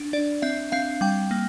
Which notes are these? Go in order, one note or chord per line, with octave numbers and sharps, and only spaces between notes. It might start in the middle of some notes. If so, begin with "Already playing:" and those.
Already playing: D4
D4 D5
C4 E5
C4 F5
G3 G5
A#3